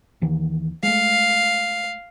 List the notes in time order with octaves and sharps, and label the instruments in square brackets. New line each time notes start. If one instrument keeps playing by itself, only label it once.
[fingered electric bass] D#2 D#3 E3
[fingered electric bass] G#3 A3 [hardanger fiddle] F5